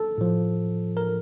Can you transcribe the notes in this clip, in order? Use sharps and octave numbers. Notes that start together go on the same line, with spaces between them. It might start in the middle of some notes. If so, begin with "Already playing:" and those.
Already playing: A4
A2 F3
A#4